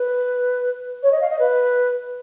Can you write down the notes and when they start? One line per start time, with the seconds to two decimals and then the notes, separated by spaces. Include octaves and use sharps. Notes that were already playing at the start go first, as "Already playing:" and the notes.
Already playing: B4
1.03 C#5
1.12 D#5
1.21 F5
1.30 D#5
1.39 B4